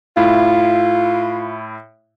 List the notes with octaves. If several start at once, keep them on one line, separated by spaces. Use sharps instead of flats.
A2 E4 F4